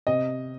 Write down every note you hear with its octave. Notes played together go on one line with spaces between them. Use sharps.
C3 D#5